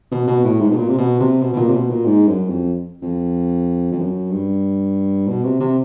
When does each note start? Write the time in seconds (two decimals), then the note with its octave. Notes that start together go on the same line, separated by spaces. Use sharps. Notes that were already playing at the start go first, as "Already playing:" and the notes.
0.12 B2
0.27 B2
0.44 A2
0.60 G#2
0.70 B2
0.76 A#2
0.88 C3
0.98 B2
1.20 C3
1.41 B2
1.53 B2
1.57 A#2
1.67 C3
1.73 B2
1.89 A#2
2.05 G#2
2.27 F#2
2.49 F2
3.02 F2
3.92 F2
3.99 F#2
4.31 G2
5.27 B2
5.43 C3
5.60 C3